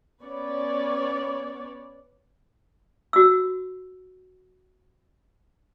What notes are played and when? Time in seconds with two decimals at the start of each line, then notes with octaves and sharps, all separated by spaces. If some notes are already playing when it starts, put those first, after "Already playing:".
0.22 B3 C#4 B4 C#5 D5
3.13 F#4 E6